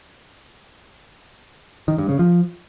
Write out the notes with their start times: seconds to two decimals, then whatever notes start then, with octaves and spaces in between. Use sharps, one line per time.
1.88 D#3
1.98 G2
2.09 C#3
2.19 F3